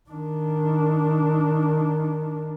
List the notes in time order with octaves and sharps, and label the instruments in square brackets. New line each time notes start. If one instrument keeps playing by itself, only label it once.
[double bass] D#3 D4